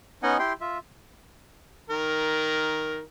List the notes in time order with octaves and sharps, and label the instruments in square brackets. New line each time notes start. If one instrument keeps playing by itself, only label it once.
[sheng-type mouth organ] B3 C#4 D#4 D#5 F#5 G#5
E4 G4 G5 C6
F4 E5
[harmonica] D#3 A#4